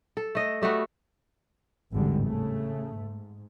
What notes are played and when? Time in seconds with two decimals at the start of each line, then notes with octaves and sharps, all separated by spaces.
0.17 A4
0.35 A3 D#5
0.61 G3 A3 B3 F#4
1.92 G#1 E2 A2 D3 G3 G#3
2.24 C#3 A3
2.97 G#2